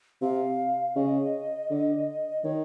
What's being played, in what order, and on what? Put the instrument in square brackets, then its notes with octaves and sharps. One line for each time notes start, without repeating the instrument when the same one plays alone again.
[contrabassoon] C3 [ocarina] F5
[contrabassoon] C#3 [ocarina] D#5
[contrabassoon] D3
[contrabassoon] D#3 [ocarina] C#5